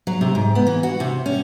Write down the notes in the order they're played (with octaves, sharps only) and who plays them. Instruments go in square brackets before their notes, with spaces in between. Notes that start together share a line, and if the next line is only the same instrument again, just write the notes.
[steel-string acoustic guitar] F#3
C3
G#2
B3
E3
F#4
C3
C#4